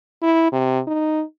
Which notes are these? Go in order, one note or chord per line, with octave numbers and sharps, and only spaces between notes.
E4
C3
D#4